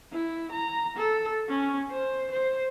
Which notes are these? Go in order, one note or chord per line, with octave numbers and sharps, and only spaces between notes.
E4
A#5
A4
C#4
C5
C5